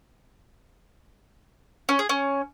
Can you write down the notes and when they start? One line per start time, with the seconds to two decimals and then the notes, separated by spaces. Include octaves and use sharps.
1.89 C#4
1.99 G#4
2.09 C#4